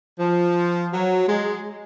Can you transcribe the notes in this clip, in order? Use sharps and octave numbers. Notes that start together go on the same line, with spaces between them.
F3
F#3
G#3